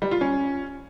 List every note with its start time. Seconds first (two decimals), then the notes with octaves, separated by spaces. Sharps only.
0.02 G3
0.11 F4
0.21 C#4